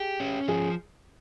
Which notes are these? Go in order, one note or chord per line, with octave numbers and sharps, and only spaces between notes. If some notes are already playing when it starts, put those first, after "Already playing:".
Already playing: G4 G#4
C#4
F3 G#4